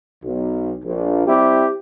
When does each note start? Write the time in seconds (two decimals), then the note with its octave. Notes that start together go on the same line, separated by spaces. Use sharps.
0.24 B1
0.84 A#1
1.27 G3 C4 E4 G4